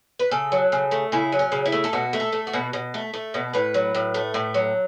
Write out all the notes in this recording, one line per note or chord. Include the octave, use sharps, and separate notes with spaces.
B4
C#3 A4
F#3
C#3
A3
C#3 E4
F#3
C#4
C#3
E4
A3
A4
B2 F#4
A3
A4
A3
F#4
B2
B2
A3
A3
B2
A2 B4
F#3
A2
A3
A2
F#3